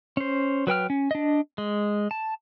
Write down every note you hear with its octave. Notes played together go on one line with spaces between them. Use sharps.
C#4 C5
F#3 B4 G5 F6
C#4
D4 D#5
G#3
A5